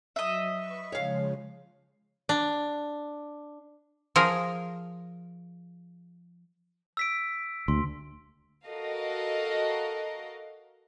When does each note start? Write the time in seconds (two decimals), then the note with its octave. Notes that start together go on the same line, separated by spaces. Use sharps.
0.16 F#3 D#5 E5
0.54 B4 C#6
0.92 C#3 F3 G#3 C#5 F5
2.29 D4
4.16 F3 G#4 A#4
6.97 E6 B6 D7
7.68 D2 C6
8.67 F#4 A4 A#4 D#5 F5